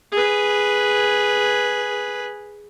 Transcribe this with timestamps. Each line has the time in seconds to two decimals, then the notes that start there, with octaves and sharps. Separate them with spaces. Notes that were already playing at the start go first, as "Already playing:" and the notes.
0.12 G#4 B4